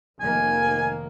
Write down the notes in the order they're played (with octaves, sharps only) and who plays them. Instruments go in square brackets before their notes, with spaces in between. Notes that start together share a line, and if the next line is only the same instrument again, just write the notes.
[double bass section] F1 D#3 A#3 [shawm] G#5